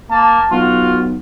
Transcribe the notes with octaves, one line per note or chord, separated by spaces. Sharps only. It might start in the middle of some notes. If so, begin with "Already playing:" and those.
A#3 A5
B1 F4 F#4